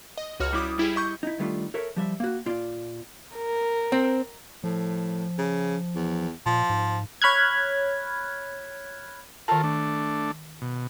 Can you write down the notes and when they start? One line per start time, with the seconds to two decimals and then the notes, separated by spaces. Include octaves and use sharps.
0.18 D#5
0.40 C#2 F#4 C#5 F6
0.53 G3 E4 D6 D#6
0.78 G3 E4 G4 G#4
0.96 D#5 C#6 G6
1.23 D#4 E4
1.39 D#3 G3 A3 D4 F4
1.74 A4 A#4 C#5 E5
1.96 F3 G3 E5
2.20 A#3 F#4
2.46 A#2 F4 D5
3.36 A#4
3.92 C4
4.64 A2 F3
5.38 C#3
5.95 E2
6.46 A#2 F3
6.70 G#2
7.22 C#5 B5 F6 F#6 G#6
9.48 D#3 F4 A4 A#4 A5
9.64 A3 D4
10.62 B2